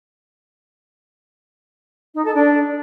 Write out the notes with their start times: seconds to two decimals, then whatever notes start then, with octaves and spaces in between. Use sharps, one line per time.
2.16 D#4
2.25 A4
2.34 D4